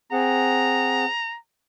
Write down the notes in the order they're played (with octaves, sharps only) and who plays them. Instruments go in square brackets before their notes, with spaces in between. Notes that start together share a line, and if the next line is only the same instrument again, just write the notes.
[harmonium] C4 G#4 F#5 [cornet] A#5